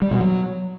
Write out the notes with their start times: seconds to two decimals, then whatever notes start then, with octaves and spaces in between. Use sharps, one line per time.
0.02 G3
0.11 B2
0.21 F#3